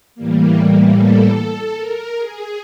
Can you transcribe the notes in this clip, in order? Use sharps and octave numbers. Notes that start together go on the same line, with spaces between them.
A2 E3 G3 A#3
A4
A#4
G#4